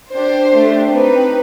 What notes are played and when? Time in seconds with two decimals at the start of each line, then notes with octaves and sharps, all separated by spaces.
0.12 D4 G4 C5
0.52 A3 D4 G4
0.91 C4 D#4 G4 B4